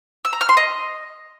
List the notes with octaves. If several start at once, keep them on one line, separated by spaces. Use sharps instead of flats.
E6
A#5
F6
C6
D#5